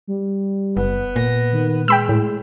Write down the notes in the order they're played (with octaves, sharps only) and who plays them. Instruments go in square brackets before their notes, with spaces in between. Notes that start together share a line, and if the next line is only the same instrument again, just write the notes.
[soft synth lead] G3
[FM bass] F#1 [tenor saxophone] B3
[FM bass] A#2 [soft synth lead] A#6
[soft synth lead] D#3
[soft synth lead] G#3 [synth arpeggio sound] G5 B5 E6
[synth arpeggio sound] A2